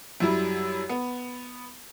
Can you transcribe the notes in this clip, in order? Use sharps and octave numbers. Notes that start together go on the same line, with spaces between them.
F#2 F#3 G3 E4
B3